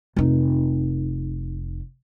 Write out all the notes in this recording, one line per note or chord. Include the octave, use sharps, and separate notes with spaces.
F1 D#4